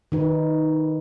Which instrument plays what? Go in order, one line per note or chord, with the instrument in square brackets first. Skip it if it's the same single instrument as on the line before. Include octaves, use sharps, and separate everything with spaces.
[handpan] D#3 D#4 B4